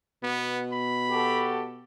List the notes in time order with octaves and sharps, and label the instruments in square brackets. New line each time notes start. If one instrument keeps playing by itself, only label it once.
[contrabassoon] B2 [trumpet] B3
[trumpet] B5
[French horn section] F#4 G4 A4